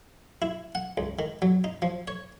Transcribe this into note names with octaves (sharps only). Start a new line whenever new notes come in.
E4
F#5
C#2
D#3
F#3
D#4
F3
C#5